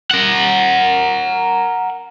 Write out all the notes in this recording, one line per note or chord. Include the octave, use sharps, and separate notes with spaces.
A#4 F#5